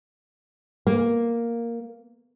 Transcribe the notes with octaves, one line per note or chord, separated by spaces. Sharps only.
A#3